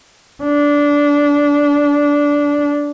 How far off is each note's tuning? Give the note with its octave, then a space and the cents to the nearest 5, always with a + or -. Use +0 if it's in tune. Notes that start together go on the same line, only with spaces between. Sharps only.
D4 -15